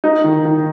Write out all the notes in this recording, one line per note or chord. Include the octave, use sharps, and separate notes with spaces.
D#4
D#3
D#3